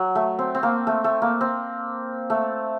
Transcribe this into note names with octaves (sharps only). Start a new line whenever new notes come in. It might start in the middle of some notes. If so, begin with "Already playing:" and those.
Already playing: F#3
A3
C4
C4
A#3
A3
A3
A#3
C4
A3